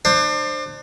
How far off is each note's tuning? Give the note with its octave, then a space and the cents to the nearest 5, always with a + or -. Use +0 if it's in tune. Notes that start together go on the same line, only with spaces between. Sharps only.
D4 +35 C5 +15